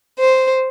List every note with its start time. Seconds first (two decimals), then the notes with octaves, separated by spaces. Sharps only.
0.19 C5